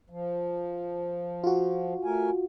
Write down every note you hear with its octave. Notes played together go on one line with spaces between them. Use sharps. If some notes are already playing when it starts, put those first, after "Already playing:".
F3
F4 F#4
A3 A#4 G#5